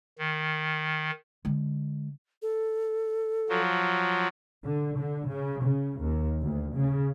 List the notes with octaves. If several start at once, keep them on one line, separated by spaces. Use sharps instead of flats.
D#3
D3 G#3
A4
F3 F#3
D3
D3
C#3
C#3
D#2
D2
C#3